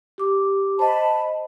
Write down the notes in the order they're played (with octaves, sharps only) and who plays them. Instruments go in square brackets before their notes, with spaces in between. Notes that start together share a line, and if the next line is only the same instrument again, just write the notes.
[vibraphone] G4 D6
[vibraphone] C5 D#5 [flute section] A5 B5